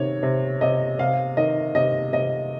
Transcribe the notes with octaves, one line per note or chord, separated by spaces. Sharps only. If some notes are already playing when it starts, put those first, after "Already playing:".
Already playing: C3 D#3 C#5
C3
C3 D#5
C3 F5
D#3 D#5
C3 D#5
C3 D#5